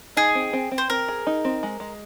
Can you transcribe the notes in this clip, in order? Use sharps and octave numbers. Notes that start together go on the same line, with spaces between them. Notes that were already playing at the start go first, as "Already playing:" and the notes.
D#4 G#4
C4
C4
C4
C5
C4 A#4
G#4
D#4
C4
G#3
G#3